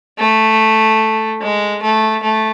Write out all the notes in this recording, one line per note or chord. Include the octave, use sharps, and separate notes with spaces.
A3
G#3
A3
A3